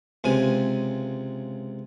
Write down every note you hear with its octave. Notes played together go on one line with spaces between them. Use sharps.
C#2 C3 G#5